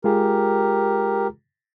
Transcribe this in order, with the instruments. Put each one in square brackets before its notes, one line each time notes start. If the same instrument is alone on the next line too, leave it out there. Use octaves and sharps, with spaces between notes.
[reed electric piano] G#3 F4 G#4 [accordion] G4 A#4